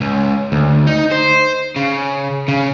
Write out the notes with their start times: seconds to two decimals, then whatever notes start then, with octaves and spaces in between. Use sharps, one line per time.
0.01 C#2
0.52 D2
0.87 D#4
1.11 C5
1.76 C#3
2.48 C#3